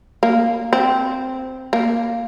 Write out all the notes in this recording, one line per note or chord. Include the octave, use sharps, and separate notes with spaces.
A#3
C4
A#3